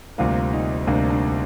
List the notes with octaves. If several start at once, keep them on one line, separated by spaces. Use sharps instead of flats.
D2 C3 G3 A#3 F4
D#4
D2 C3 G3 A#3 D4
D4